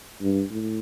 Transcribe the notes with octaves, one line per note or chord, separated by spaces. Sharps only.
G2
A2